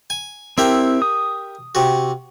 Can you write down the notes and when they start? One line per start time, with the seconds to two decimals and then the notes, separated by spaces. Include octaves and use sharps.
0.10 G#5
0.58 C4 E4 G4 A#4 E5
1.02 D#6
1.75 C3 F#4